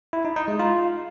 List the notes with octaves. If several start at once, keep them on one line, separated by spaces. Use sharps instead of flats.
E4
D#4
D#4
G#3
F4